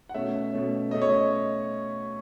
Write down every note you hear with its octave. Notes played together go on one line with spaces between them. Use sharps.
F#5
B2 A3 C#4 E5
B2 A3 C#4
B2 A3 C#4 D#5
C#5
D#5